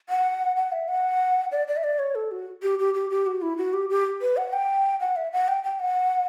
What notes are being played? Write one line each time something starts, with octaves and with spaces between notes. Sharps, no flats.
F#5
F#5
E5
F#5
D5
D5
E5
D5
C#5
A4
F#4
G4
G4
G4
G4
F#4
E4
F#4
G4
G4
B4
F#5
G5
F#5
E5
F#5
G5
G5
F#5